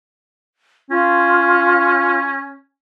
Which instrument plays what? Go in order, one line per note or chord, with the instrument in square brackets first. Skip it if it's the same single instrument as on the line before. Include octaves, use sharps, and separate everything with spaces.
[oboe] C#4 [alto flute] F4